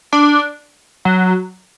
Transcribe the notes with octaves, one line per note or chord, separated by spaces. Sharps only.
D4
F#3